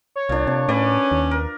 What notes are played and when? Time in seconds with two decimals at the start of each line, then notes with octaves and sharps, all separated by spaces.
0.16 C#5
0.29 C2 A#2 D4
0.47 C3 A5
0.68 A2 C#4 B4 D5
1.12 D#2
1.31 A#4